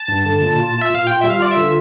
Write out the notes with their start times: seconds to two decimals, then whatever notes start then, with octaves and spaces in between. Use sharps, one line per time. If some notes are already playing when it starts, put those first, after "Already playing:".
Already playing: A5
0.08 G2
0.25 D3
0.41 A#2
0.59 F4
0.74 F4
0.81 E5
0.90 A#2 F5
1.07 F4 G5
1.21 G3 E5
1.30 F5
1.40 F4 D5
1.51 E5
1.56 D3